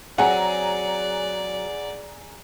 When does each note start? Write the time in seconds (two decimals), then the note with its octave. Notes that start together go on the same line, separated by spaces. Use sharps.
0.18 F#3 C4 G#4 D5 F#5 G#5 A#5